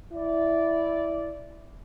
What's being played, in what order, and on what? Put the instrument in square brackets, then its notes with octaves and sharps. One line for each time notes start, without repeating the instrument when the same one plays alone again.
[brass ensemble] E4 D5